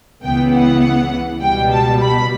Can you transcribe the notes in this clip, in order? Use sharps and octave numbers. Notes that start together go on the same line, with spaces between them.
C#2 C#3 E3 B3 G5
F#5
C#2 B2 G3 G5
A5
B5